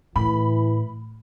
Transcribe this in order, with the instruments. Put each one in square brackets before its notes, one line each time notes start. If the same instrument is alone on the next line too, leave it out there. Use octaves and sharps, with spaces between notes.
[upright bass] A2 [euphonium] E3 [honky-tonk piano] B5